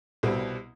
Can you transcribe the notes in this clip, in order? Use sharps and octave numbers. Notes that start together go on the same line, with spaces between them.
C2 B2 G3 C4